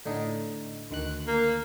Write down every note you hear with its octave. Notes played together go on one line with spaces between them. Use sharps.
A2 D3 D#4
D2 D#3 F#6
A#3